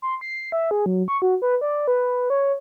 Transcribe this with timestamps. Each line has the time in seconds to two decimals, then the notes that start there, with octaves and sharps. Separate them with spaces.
0.02 C6
0.21 C7
0.52 E5
0.71 G#4
0.86 F#3
1.08 C#6
1.22 F#4
1.42 B4
1.61 D5
1.88 B4
2.30 C#5